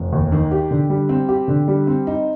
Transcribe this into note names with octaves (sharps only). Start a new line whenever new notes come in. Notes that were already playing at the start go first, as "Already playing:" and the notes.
Already playing: F1
D#2
D#3
G4
D3
G3
C4
G4
D3
G3
C4
D#4